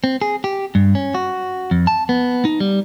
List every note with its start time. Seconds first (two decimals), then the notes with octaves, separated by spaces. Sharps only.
0.04 C4
0.22 G#4
0.44 G4
0.75 G2
0.95 C#4
1.15 F#4
1.71 F2
1.87 A5
2.09 B3
2.45 D#4
2.60 G3